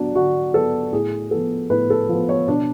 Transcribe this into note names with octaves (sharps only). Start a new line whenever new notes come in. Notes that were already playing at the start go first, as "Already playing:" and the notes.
Already playing: D3 F#3 B3 D4
D3 F#4
F#3 B3 A4
A2 G#4
F3 B3 A4
A2 B4
A4
F3 B3
C#5
B2 D4